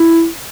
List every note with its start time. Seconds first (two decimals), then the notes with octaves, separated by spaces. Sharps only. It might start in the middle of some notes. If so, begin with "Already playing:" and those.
Already playing: E4